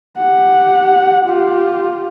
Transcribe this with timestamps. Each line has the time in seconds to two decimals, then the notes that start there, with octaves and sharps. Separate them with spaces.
0.18 G4 F#5
1.25 F4 G4